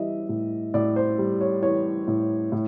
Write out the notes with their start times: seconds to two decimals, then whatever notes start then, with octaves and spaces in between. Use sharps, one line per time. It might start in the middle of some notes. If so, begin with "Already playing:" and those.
Already playing: E3 G3 D#5 E5
0.29 A2
0.74 A2 D5
0.96 C5
1.18 G3
1.41 C#5
1.63 E3 C#5
2.08 A2
2.52 A2